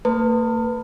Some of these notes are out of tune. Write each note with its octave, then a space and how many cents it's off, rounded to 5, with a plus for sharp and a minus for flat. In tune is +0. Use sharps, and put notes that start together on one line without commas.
A#3 -45 B4 +0 A5 +45